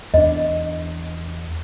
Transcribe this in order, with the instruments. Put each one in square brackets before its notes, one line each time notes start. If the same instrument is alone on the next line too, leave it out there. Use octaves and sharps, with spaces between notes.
[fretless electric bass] E2 D4 [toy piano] D#5